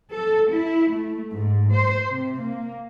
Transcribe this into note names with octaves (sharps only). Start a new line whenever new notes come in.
A4
E4
A3
G#2
C5
C3
A#3